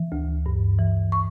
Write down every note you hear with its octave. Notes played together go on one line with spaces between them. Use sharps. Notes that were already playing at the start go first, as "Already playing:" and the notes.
Already playing: E3
D2
G2
E3
C#6